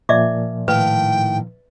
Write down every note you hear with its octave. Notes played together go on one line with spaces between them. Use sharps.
A#2 F3 D5 E5 D6
A2 D#3 B4 F5 G5